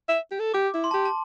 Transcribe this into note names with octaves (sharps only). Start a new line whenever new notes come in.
E5
G4
A4
G4 D6
E4
C6
A5
G4
A5